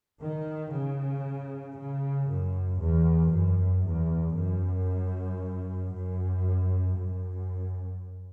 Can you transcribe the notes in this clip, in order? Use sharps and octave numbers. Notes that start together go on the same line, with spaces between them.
D#3
C#3
C#3
F#2
E2
F#2
E2
F#2
F#2
F#2